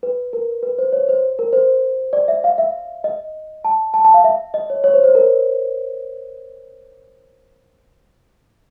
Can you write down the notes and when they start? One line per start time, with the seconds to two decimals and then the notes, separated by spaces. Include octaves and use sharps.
0.03 B4
0.33 A#4
0.63 B4
0.78 C5
0.93 C#5
1.09 C5
1.39 A#4
1.53 C5
2.13 D5
2.28 E5
2.44 F5
2.58 E5
3.04 D#5
3.65 A5
3.94 A5
4.05 A5
4.14 F5
4.24 E5
4.54 D#5
4.70 C#5
4.84 C#5
4.94 C5
5.04 C5
5.15 A#4